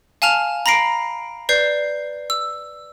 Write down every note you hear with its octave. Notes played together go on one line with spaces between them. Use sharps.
F5 G#5 A5 F6 F7
A#5 B5 A#6 C7 D7
B4 D5 G6 C7
E6